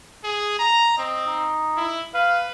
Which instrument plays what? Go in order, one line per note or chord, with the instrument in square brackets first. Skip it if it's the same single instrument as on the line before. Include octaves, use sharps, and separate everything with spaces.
[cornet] G#4
A#5
[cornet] C4 [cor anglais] D#5
[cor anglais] D#4
[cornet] E4
[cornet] B4 [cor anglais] F5